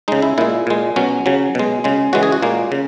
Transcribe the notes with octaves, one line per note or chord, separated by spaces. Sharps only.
C#3 G#3 D#4
E4
A#2 G#3 E4
A#2 G#3
B2 F#3 C#4
C#3 F#3
B2 G#3
C#3 G#3
C#3 E3 G#3 F#4
G#4
F#4
A#2 G#3 A#3
C#3